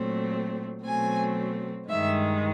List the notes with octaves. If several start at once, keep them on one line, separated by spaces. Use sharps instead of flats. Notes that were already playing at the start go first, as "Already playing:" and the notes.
Already playing: A#2 F#3 A3 C4
B2 F#3 A3 C4 G#5
G2 D#3 G#3 E5